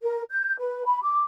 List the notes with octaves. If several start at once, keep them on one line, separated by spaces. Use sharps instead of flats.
A#4
G6
B4
B5
D6